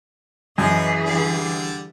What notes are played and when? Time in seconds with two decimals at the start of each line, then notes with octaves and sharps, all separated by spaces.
0.58 F#2 E3 G#4 D#5 D#6
1.06 D3 G3 D5